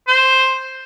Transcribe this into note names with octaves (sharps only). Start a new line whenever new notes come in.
C5